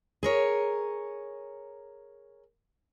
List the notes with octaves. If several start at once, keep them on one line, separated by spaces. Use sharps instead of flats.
G#4 A#4 C#5